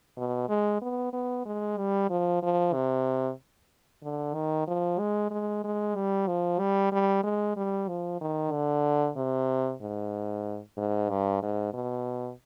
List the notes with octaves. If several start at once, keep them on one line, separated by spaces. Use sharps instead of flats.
B2
G#3
B3
B3
G#3
G3
F3
F3
C3
D3
D#3
F3
G#3
G#3
G#3
G3
F3
G3
G3
G#3
G3
F3
D#3
D3
C3
G#2
G#2
G2
G#2
B2